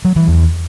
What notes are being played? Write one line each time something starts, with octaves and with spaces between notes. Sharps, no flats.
F#3
E3
E2